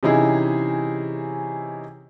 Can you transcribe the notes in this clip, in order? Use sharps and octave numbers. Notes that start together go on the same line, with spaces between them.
C3 E3 C#4 D#4 E4 G#4